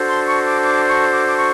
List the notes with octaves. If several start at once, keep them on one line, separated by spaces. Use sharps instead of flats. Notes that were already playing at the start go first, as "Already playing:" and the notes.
Already playing: D4 F#4 A4 C5
C6
C#6
D6
D6
C#6
D6
D6
C#6